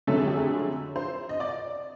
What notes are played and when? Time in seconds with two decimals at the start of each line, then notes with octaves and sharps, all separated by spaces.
0.07 F2 D3 F#3 A3 C#4 A4
0.18 G#4
0.27 G4
0.36 G#4
0.96 C5
1.29 D#5
1.40 D5